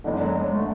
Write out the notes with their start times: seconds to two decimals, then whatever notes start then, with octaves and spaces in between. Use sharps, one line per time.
0.04 F#1 E2 D3 G#3
0.20 F#3
0.36 G#3
0.51 D3 A3